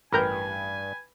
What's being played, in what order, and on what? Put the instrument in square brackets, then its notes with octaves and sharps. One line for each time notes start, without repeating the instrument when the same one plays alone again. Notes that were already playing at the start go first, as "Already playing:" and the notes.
[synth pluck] A1 A#4 G6 [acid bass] G2 [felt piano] B4 G5 B5 [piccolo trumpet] G#5